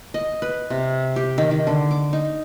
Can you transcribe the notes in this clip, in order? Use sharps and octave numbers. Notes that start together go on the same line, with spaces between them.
D#5
B4
C3
G4
D#3
D#3
D3
D6
D#4